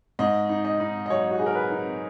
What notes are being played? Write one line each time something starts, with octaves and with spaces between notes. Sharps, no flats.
G#2 D#5
D#4
D#5
D#4
D#5
F#3 C#5
F#4
D#4 G#4
A#4
B4
D#4